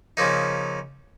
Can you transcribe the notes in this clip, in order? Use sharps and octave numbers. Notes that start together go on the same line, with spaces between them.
C#3 F3 A#3 D#4